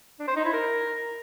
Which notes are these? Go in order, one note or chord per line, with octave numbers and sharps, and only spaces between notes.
D4
C5
D#4
E4
A#4